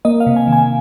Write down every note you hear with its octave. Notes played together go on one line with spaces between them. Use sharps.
A#3 D#5
F5
C3
G#5
D#3 G#5